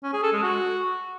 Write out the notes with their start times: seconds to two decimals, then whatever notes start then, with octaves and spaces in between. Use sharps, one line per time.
0.03 C#4
0.13 G#4
0.23 A4
0.33 G#3
0.43 F#4